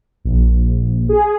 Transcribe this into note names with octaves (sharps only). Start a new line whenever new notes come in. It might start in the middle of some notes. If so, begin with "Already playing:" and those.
A#1
G#4